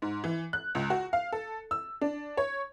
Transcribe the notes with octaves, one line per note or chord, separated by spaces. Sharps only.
G#2
E3
F#6
C#2
F#4
F5
A4
E6
D4
C#5